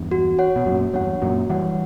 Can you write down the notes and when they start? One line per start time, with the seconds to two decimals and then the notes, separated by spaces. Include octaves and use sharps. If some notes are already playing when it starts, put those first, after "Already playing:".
Already playing: E2 G2
0.11 F#4
0.39 C#5 F#5
0.56 B2
0.66 F#2 A#2 F#4
0.94 E2 G2 C#5 F#5
1.22 F#2 A#2 F#4
1.50 E3 G3 C#5 F#5